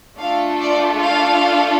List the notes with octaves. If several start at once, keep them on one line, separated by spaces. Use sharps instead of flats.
A3 D4 F4 A4 F5
D5
F5